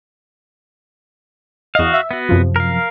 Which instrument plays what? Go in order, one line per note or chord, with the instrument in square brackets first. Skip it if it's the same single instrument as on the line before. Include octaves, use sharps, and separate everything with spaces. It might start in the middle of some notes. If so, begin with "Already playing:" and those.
[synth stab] E2 D#5 [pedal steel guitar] F#4 F5
[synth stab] E5
[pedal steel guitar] B3 F#4
[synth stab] F#2 C3 F3
[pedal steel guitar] A#4 F5